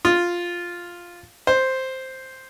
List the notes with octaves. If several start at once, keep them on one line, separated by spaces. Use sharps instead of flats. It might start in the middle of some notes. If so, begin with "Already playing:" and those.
F4
C5